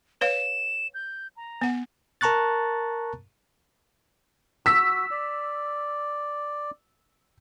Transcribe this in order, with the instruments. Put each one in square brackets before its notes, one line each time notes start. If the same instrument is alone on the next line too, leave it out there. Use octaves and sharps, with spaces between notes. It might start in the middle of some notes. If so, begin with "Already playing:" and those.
[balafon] B4 C#5 F5 [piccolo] E7
[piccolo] G6
A#5
[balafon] B3 F#5
[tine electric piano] A#4 A5 A#5 C#6 F#6 A6
[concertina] F#4 [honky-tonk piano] E6 B6
[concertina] D5